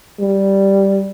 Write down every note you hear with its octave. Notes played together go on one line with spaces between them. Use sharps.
G3